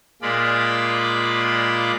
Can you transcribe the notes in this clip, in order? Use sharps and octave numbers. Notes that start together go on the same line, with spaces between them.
A#2 G#3 F4 D5 B5